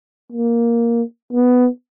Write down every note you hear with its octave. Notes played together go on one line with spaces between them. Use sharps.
A#3
B3